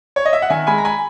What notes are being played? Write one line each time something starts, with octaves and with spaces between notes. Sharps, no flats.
C#5
D#5
E5
F#5
D#3 E5 G#5
G#3 G#5 B5
A#5
G#5 B5